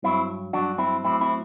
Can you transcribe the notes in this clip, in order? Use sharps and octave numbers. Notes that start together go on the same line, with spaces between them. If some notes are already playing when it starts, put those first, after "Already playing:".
G2 F#3 C4 E4
G2 F#3 D4 F#4
C4 E4
A2 F#3 C4 E4
C4 E4